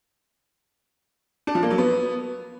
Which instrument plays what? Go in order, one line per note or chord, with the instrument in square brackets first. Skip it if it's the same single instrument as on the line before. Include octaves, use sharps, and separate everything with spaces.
[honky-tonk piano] D4
F3
A#3
F#3
B3